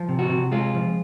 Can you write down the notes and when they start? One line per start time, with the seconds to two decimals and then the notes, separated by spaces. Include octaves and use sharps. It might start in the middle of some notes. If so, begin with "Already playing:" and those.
Already playing: F3
0.09 C3
0.19 F#4
0.30 C3
0.52 G#3 F4
0.74 F3